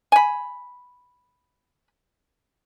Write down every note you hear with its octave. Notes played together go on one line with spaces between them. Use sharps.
G#5 B5